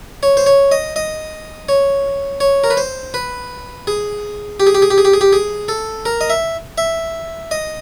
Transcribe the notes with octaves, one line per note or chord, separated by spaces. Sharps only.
C#5
C5
C#5
D#5
D#5
C#5
C#5
A#4
B4
C5
B4
G#4
G4
G#4
G4
G#4
G4
G#4
G4
G#4
G4
G#4
A4
A#4
D#5
E5
E5
D#5